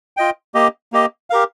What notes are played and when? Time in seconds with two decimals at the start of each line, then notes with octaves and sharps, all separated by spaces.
0.17 F4 D#5 G5
0.54 A#3 G4 D#5
0.93 A#3 G4 D#5
1.30 G4 A#4 F5